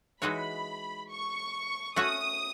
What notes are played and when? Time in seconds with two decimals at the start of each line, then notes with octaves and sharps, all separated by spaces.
0.22 E3 G#3 D#4 F#4 C#5 B5
1.10 C#6
1.96 A3 C#4 F#4 C#5 D#6